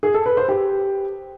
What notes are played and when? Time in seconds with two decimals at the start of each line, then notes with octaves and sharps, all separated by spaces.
0.03 G#4
0.14 A4
0.26 B4
0.37 C5
0.49 G4